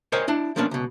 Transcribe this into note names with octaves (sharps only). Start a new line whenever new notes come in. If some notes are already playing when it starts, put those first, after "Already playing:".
A#4 C5 C#5 D#5 G5 G#5
D4 E4
F3 A#3 B3 C#4 D4
C#2 B2